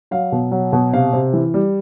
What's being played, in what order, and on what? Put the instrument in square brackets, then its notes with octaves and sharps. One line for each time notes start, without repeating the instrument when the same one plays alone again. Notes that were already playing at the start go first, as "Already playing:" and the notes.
[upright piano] F#3 F5
B2
F#3
B2
C3 F5
C3
E3
G3